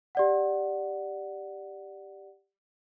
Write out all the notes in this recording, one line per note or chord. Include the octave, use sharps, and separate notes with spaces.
G4 D5 F#5